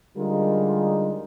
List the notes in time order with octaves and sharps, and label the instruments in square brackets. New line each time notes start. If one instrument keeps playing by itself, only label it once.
[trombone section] D3 G3 G#3 D#4 F4 A#4